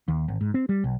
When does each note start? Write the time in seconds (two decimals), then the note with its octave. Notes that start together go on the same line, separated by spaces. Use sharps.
0.08 D#2
0.28 G#1
0.41 G#2
0.54 C4
0.69 G3
0.84 B1